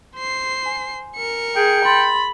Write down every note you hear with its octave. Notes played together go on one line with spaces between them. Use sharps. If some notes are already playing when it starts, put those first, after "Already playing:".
C5 C7
G#5
A#4 C#7
G#4 G5
B5 C6 A6